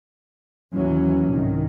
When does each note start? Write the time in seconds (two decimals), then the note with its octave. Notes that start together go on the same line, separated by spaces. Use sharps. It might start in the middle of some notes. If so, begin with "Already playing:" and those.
0.73 D#2 E3 F#3 C#4
1.29 C2 G#2 D#3